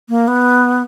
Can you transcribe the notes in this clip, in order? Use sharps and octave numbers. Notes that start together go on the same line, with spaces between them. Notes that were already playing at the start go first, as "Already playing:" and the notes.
A#3
B3